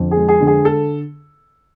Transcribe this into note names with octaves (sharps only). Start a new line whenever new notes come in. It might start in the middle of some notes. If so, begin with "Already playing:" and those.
Already playing: F2 D3
G#4
G#3
G#4
D3
G#4
A4